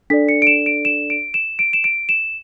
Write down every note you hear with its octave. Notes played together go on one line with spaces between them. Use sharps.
D4 A4 D5 B6
C#7
D7
E7
D7
E7
D7
E7
D7
E7
D7
E7